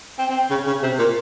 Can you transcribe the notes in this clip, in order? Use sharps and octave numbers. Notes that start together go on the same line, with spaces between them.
C4
C4
C#3
C#3
C3
A#2